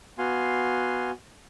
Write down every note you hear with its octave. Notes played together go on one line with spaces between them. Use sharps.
B3 F#4 F5 G#5 C6